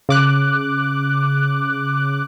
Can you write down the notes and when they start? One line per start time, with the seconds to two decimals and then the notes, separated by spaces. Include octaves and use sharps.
0.09 C#3 D6 F#6